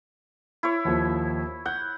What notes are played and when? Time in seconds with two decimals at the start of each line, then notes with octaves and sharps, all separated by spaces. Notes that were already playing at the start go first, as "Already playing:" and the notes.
0.63 E4 C#5
0.85 D#2 F3
1.66 F#5 G6